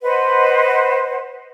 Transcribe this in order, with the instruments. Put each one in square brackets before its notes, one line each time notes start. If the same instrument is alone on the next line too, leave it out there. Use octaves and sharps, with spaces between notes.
[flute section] B4 C5 D#5 F#5